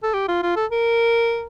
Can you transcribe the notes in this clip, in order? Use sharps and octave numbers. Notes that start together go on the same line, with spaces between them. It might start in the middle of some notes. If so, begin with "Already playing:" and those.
A4
G4
F4
F4
A4
A#4